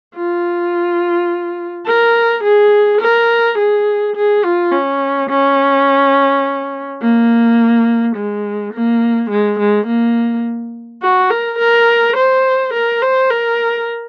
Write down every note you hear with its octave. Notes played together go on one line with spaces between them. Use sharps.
F4
A#4
G#4
A#4
G#4
G#4
F4
C#4
C#4
A#3
G#3
A#3
G#3
G#3
A#3
F#4
A#4
A#4
C5
A#4
C5
A#4